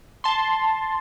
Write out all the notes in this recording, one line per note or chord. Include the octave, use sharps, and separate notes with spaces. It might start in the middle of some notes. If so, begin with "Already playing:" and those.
A5 C6